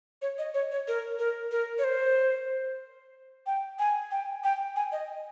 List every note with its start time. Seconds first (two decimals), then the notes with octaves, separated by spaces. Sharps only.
0.22 C#5
0.38 D#5
0.54 C#5
0.72 C#5
0.88 A#4
1.19 A#4
1.51 A#4
1.79 C#5
1.84 C5
3.46 G5
3.79 G#5
4.11 G5
4.44 G5
4.76 G#5
4.92 D#5